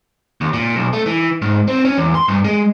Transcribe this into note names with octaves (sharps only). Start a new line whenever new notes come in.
D#2
A#2
B1
A3
E3
G#2
C4
C#4
E2
C6
G2
G#3